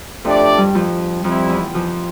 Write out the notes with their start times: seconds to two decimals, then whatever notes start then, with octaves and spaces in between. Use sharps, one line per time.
0.25 F2 F3 A3 D4 G4 D5
0.58 G2 G3
0.74 F2 F3
1.24 F2 F3 G3 C4 E4
1.49 E2 E3
1.74 F2 F3